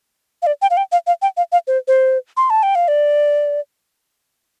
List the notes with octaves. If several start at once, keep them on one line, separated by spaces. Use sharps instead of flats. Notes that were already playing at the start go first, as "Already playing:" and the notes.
F5
D5
G5
F5
G5
F5
F5
G5
F5
F5
C5
C5
C6
A5
G5
F5
D5